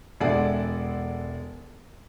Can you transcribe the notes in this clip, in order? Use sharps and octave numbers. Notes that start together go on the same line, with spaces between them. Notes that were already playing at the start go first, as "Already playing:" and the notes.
E1 G#3 A4 D5 E5 F#5